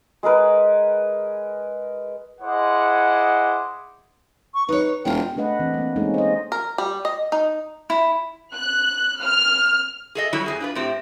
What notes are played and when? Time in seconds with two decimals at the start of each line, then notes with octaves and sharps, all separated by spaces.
0.23 G#3 G#4 A#4 B4
2.41 E4 G#4 C5 D#5 F#5 D6
4.54 C#6
4.69 D#4 B4 C#5
5.05 E1 F3 F4 G5
5.36 A3 D4 B4 D#5 F#5
5.60 E3 C4
5.74 A#3 C4
5.96 G#3 A#3 C4 C#4 D#4 A4
6.14 C5 D#5
6.52 A#4
6.78 G3
7.05 D#5
7.32 D#4
7.90 E4
8.54 F#6
9.22 F6
10.15 G#4 A4 D#5
10.33 F#3 G3 E4
10.46 F2 C3 G#4
10.60 D4 F4 B4
10.75 A2 C4 G4